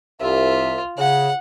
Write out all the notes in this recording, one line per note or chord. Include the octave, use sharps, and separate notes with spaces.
C2 F4 E5
C#3 F#5